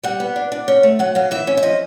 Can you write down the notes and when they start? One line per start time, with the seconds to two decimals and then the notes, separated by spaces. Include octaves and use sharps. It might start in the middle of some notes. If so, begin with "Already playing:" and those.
0.03 G3 F#5
0.20 B3
0.36 D4
0.52 D4
0.68 C#4
0.83 A3
0.99 F#3 F#5
1.15 F#3 F5
1.31 E3 E5
1.47 C#4
1.57 E5
1.63 F3 D#5